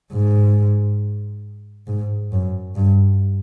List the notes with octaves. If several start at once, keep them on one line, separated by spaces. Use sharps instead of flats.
G#2
G#2
F#2
G2